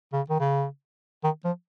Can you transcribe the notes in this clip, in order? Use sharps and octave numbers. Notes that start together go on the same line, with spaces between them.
C#3
D#3
C#3
D#3
F3